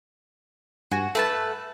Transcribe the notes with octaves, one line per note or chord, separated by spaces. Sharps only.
G2 F#4 F#5 G#5
A3 A4 B4 A5